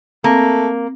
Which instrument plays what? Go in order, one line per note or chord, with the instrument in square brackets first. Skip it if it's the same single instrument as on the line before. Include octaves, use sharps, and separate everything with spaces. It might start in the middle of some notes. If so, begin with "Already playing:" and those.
[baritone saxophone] A3 [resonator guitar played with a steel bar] A#3 [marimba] C4